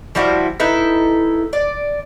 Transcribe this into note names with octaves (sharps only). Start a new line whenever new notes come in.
F3 G3 E4 F#4
D#4 E4 A4 B4
D5